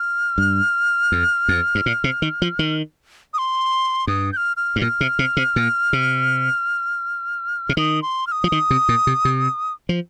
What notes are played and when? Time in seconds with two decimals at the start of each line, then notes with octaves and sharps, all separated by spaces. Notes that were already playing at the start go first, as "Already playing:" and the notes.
Already playing: F6
0.38 G2
1.12 F2
1.48 F2
1.75 G2
1.86 A#2
2.04 C3
2.22 D#3
2.42 F3
2.59 D#3
3.34 D#6
3.38 C6
4.07 G2 D#6
4.32 G6
4.37 F6
4.57 F6
4.76 G2
4.81 A#2 F6
5.01 C3
5.19 C3
5.37 C3
5.56 A#2
5.93 C3
7.69 C3
7.77 D#3 D#6
8.02 C6
8.27 F6
8.32 D#6
8.44 F3
8.52 D#3
8.70 C3
8.89 A#2
9.07 C3
9.25 C3
9.89 F3